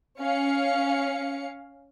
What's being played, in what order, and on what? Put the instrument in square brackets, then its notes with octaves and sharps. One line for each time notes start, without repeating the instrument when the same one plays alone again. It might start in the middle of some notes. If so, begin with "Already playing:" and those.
[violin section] C#4 F5 C#7